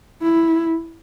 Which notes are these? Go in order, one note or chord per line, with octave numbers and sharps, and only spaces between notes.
E4